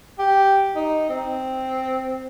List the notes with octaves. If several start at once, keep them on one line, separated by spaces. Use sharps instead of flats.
G4
D#4
C4